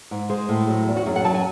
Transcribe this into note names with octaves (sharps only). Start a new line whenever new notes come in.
G#2
G#3 C5
A2
F#3
E2
F#4
F#2 G#4
F#5
F#3 A5
G#5